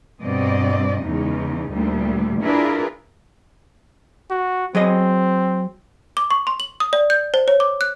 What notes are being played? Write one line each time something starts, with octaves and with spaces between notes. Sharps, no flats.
G2 B2 C4 D5 D#5
E2 C#3 G#3 D#4
D2 A#2 G3
D4 E4 F4 G#4 A#4 B4
F#4
F#3 C4 G#4 D#5
D6
C#6
C6
F#7
D#6
D5
G6
C5
C#5
D6
F#6